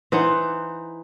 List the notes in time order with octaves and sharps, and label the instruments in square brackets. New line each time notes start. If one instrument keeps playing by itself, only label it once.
[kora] E3 D#4 C5 F#5